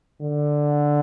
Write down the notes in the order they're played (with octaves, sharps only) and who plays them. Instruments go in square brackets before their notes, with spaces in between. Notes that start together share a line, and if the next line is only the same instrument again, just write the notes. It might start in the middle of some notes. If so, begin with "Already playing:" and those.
[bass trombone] D3